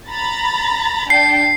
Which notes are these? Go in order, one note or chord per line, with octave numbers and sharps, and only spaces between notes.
A#5 B5 A6
D4 G5 A5 C7